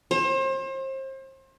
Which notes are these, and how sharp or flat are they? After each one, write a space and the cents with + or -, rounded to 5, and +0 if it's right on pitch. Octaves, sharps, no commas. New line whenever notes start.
C5 +35